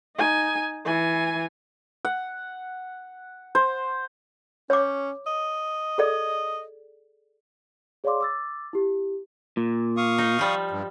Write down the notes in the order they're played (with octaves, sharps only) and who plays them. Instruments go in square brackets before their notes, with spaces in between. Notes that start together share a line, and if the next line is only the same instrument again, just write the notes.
[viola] D#4 G#5
E3 G#5
[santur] F#5
C5
[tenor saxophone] C#4 [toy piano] C#5 D6
[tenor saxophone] D#5
[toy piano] G#4 A4 D5
[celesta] G#4 C#5 D5 F5 C6 D6
D6 E6 A6
E4 G4
[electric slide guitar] A#2
[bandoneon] F5 C#6 D#6
[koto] D#4
F3 G3
[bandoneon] G2